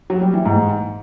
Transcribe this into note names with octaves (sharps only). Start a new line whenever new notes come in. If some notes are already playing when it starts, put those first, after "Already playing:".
F#3
G3
E3
G#2